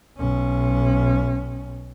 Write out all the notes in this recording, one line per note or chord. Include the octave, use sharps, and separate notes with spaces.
B1 C#4